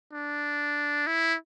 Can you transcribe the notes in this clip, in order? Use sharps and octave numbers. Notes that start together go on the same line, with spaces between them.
D4
E4